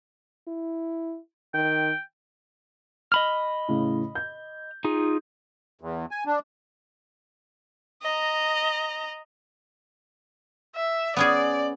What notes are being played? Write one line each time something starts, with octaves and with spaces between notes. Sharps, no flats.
E4
D#3 G5
D#5 B5 F6
A2 C#3
G6
D#4 F4 G#4
E2
G#5
D4
D#5 A#5
E5
B3 C#4 G#4 D5